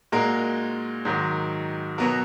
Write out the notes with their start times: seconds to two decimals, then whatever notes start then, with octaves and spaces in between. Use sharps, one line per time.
0.12 A#2 G#3 D#4 F#4 A#4
1.05 G#2 D#3 F#3
1.98 B2 F#3 B3 F#4 A#4